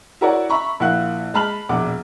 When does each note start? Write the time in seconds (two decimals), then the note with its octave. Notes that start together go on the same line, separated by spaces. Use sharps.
0.21 E4 F#4 A#4 C#5 D5 F#5
0.50 E5 A#5 B5 C#6
0.80 A#1 A#3 E4 F#5 F#6
1.34 G#3 A5 B5 F6 F#7
1.69 E1 A#1 F#5 D6